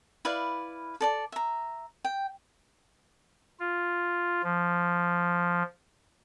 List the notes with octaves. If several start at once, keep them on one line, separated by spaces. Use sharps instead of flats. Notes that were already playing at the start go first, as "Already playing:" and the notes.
E4 B4 D5 F5
A4 D5 A5
E5 A#5
G5
F4
F3